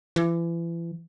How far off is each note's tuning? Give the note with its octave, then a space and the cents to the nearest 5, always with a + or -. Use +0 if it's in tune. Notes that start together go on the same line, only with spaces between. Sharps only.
E3 +35